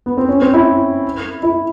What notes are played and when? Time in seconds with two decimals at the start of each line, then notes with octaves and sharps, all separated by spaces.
0.06 B3
0.17 C4
0.29 C#4
0.41 C4
0.54 E4
1.43 E4